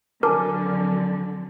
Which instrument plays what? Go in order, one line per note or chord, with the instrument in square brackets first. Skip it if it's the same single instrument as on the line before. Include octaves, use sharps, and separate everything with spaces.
[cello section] F2 D3 F#3 [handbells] A#4 [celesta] G#5 A5 D6